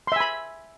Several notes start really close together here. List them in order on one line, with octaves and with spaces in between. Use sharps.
C6 E5 G#5 B5